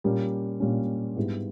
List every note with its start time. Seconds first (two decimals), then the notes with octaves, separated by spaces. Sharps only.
0.04 A#2 G3 A#3 C#4
0.60 A#2 G3 A#3 C#4
1.16 G#2 G3 B3 E4